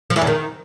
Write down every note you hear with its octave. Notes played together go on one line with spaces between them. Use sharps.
F3
E3
E2
D#3